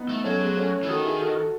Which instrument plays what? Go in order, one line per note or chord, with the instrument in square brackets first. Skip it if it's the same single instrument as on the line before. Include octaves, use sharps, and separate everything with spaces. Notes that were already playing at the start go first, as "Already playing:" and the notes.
Already playing: [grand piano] B3 D#4
[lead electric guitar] A3
[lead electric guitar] F#3 [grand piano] A3 C#4
[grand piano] G#3 B3
A3 C#4
[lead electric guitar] E3
[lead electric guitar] D#3 [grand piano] F#4 A4
[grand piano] E4 G#4
F#4 A4
F#4 A4